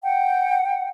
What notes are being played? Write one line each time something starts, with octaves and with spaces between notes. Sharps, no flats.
F#5 G5